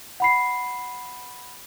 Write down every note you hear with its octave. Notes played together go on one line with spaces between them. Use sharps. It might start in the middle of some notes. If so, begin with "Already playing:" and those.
F#5 B5 C7